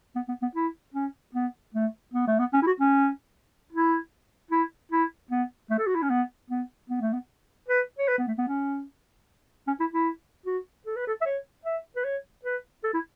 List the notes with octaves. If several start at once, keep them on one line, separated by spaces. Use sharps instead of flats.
B3
B3
B3
E4
C#4
B3
A3
B3
A3
B3
C#4
E4
F#4
C#4
E4
E4
E4
B3
A3
A4
F#4
E4
C#4
B3
B3
B3
A3
B3
B4
C#5
B4
B3
A3
B3
C#4
C#4
E4
E4
F#4
A4
B4
A4
E5
C#5
E5
B4
C#5
B4
A4
E4